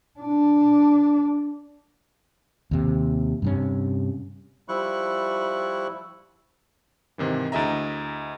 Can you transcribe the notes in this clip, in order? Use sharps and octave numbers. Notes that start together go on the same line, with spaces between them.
D4
D#2 C3
G2 C3 C#4
F3 G3 E4 C#6 F#6
G#2 C3 D#3 E3
D2 E4 G#4 D#5 E5 A#5